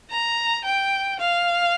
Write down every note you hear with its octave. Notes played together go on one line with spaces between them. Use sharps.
A#5
G5
F5